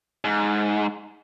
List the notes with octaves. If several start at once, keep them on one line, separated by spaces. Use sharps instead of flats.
G#2